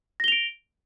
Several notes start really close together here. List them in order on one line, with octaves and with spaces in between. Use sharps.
A#6 G7 F7 D7